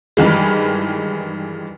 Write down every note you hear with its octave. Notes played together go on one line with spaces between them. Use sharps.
G2 D#3 E3 G#3